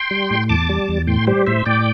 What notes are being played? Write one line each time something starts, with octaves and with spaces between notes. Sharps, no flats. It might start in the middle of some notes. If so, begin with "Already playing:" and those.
Already playing: G5 C6
G3
A2
E2 A5 D6
G3
E2
A2 G5 C6
G3 G4 C5
A2 C5 E5
A2 D5 G5